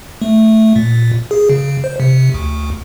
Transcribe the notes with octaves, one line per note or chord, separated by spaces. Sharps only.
A3
A#2
G#4
C#3
C5
C3
D2